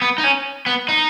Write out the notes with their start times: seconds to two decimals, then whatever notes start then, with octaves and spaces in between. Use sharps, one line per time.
0.02 B3
0.18 D#4
0.24 C#4
0.66 B3
0.89 D#4